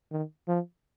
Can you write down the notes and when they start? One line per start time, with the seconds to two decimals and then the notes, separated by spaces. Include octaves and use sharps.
0.11 D#3
0.48 F3